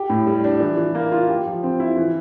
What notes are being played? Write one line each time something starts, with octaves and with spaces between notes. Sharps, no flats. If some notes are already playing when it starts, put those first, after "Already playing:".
Already playing: G4
A2
G3
D4
E3
E3
A#3
F4
G4
F3
C4
E4
E3